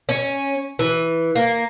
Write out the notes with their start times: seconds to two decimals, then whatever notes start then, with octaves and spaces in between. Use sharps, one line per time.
0.09 C#4
0.79 E3
1.35 A#3